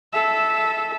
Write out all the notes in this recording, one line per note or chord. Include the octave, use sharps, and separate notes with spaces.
A4 E5